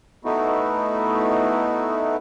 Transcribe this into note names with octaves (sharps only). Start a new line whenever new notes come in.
A3 B3 D#4 E4 F#4